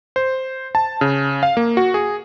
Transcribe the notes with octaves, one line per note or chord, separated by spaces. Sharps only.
C5
A5
C#3
F5
A#3
F#4
G#4